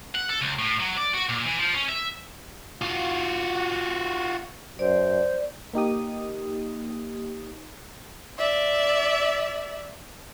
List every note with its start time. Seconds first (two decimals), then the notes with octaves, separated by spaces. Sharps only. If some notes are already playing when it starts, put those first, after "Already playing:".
0.15 F#5
0.29 A4
0.41 C#2
0.59 A2
0.80 F#3
0.97 D5
1.13 F#4
1.29 A#2
1.45 E3
1.59 F3
1.74 C#4
1.88 E5
2.81 F4 F#4
4.79 F#2 C5 D5
5.74 A#3 D#4 G4 D#6
8.38 D5 E5